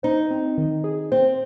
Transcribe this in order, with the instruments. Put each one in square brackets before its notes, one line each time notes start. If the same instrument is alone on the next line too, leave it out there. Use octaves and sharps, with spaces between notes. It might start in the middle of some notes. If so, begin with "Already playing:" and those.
[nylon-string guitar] D#4 [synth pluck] C5
[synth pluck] C4
D#3
G#4
[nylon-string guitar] C4 [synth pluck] C5